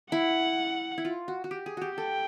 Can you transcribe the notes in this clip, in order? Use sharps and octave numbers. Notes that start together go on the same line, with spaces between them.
E4 F#5
E4
F4
F#4
F#4
G4
G#4
F#4 G4
A4 G5